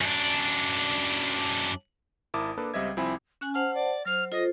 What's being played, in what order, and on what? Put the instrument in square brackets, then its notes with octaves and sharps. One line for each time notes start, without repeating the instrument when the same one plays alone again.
[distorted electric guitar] F#2 D4
[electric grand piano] G#1 E4 A#4 A5 D6 D#6
A#3 D4 A4 B4
C#2 G3 C4 D#5 E5 G#6
C2 F3 C4 E4 G#5 B5
[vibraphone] C#4 G#5 [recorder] F#6
[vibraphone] C5 F#5 A5 [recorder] F6
[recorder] D5
[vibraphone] F#3 C5 [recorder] F6
[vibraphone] F4 A4 C5 [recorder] D#5